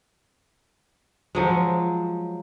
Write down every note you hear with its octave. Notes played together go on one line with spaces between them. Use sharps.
F3 F#3 G#3